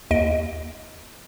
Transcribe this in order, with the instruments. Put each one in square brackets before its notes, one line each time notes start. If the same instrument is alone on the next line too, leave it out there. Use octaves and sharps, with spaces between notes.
[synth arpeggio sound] D#2 D#5 D7